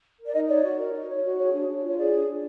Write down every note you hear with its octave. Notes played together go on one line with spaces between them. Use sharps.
A#4
D5
D#4 D#5
C#5 D5
F#4
A#4
D#4
C#5
F#4
G#4 C#5
D4
D4
F4 C#5
G#4 D5
D4
D4